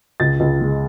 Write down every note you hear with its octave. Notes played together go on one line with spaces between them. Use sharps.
C#2 A6
C#2
G#3